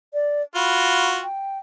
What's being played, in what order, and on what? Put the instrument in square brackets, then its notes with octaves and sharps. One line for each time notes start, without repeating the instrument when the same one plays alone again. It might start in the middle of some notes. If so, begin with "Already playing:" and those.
[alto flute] D5
[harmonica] F4 F#4 [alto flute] B5
[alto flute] G5